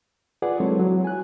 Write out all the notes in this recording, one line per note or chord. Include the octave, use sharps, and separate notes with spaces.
F4 G#4 B4 D5 F#5
F#3 G#3 C4 E4 A4 C#5
F#3
G#5 F#6